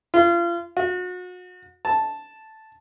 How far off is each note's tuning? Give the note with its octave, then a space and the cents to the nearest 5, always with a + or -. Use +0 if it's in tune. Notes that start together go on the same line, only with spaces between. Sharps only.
F4 -30
F#4 -35
A5 -5